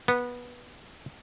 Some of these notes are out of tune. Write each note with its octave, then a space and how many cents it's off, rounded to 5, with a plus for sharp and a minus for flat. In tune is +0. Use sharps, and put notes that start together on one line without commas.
B3 -15